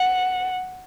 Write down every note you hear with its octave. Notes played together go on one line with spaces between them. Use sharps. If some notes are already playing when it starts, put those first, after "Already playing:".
Already playing: F#5